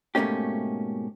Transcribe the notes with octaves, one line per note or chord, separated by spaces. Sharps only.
G#2 B2 A3 A#3 C#4 G4